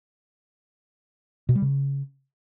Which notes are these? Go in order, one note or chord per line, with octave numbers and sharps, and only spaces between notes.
B2
G3
C#3